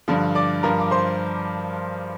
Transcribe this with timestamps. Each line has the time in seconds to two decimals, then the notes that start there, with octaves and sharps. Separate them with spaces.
0.08 G2 D3 F3
0.35 D5 D6
0.63 G2 F3 A#4 A#5
0.80 D6
0.91 C5 C6